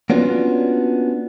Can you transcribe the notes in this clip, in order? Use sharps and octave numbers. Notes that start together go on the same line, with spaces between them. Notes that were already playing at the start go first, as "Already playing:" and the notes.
A#3 B3 C#4 D4 F4 F#4